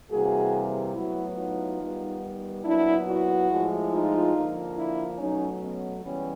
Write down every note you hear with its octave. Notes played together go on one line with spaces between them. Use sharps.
C3 E3 G3 A#3 F#4 G#4
A2 F#3 B3 E4 F#4
D#4 F4
D#3 G3 B3
A#2 F#3 B3 D4 E4
E4 F#4
A2 F3 G#3
D#4 F4
D3 F3 A#3
D4 E4
B2 F#3 A3 C#4 D#4
B3 C#4
C#3 E3 G3 B3 C#4